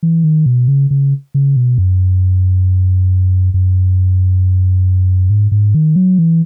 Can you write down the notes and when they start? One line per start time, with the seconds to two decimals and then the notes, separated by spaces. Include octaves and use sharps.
0.03 E3
0.24 D#3
0.46 B2
0.68 C#3
0.91 C#3
1.34 C#3
1.56 B2
1.78 F#2
3.54 F#2
5.30 G#2
5.52 G#2
5.75 D#3
5.96 F#3
6.19 E3